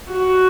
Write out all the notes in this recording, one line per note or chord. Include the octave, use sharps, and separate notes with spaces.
F#4